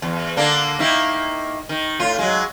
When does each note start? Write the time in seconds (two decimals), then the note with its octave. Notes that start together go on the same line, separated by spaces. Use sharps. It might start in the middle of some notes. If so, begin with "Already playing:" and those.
0.02 E2
0.37 D3 A#3 D4
0.79 D#3 A#3 E4
1.69 D#3
2.00 A2 F4
2.19 F#3 G#3